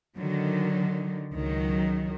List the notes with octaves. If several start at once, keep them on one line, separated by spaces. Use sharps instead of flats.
D3 D#3 F#3
C#2 D#3 F#3